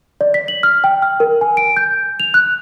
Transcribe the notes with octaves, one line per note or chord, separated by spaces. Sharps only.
D5
B6
F#7
F6
G5
F6
A#4
G#5
D7
G6
F7
F#6